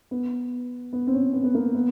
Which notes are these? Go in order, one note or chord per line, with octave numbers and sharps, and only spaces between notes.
B3
B3
C4
C#4
B3
B3
A#3
B3